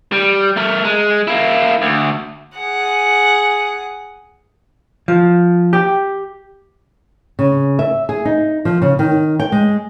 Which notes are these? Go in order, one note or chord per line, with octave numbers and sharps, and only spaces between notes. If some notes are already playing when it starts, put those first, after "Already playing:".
G3
A3 A#4
G#3
A#3 E4
D2
G#4 F#5
F3
G4
C#3
E5
G#4
D#4
F3
C#3
D#3
G5
G#3